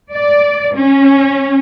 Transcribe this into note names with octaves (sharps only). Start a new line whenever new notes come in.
D5
C#4